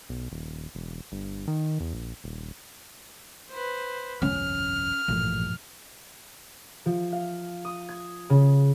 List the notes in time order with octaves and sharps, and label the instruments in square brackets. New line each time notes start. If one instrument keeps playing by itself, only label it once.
[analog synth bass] B1
D#1
E1
G1
D#3
E2
A#1
D#1
[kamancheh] B4 C5
[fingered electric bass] G1 C2 F2 [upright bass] C#4 [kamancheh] F6
[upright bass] A1 [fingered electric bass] G2 A#2 F3
[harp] F3
F5
D#6
G#6
C#3